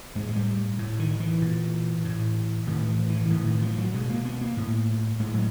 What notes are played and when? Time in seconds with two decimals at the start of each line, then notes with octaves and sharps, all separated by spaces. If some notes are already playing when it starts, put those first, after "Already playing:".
0.15 A2 G#3
0.29 G#3
0.36 G3
0.79 A2
0.99 D#3
1.20 E3
1.42 A#2
2.05 A2
2.67 A2 D#3
2.89 E3
3.10 E3
3.25 D3
3.31 A2 D#3
3.39 D3
3.46 D#3
3.62 F3
3.74 F3
3.78 F#3
3.94 B2 G#3
4.10 A#3
4.25 B3
4.41 A#3
4.57 A2
5.20 A2 G#3
5.34 F#3